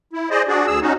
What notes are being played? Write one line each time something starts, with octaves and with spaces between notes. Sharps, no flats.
E4
G#4 C5 D5 D#5
D4 F#4 G#4 D5
D2 G#4 E6
C#4 D#4 F#4